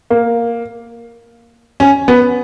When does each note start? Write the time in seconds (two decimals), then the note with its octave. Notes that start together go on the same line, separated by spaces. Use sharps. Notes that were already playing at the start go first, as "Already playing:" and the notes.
0.10 A#3
1.80 C#4
2.08 B3